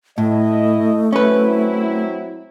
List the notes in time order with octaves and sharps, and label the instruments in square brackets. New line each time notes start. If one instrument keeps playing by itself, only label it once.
[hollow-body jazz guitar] A2 [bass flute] A3 [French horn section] E4 D#5
[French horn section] F#3 C4 E4 [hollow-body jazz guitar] C#4 B4